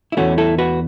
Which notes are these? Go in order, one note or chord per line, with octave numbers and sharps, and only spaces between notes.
E4
E2 E3 A3 C#4 F#4
E4 A4
F#4 B4